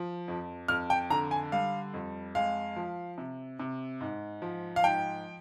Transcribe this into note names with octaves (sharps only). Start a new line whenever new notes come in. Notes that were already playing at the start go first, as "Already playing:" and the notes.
Already playing: F3
F2
F2 F6
G5
D3 A#5
G#5
G3 F5
F2
G#3 F5
F3
C3
C3
G#2
F3
F5
G#2 G5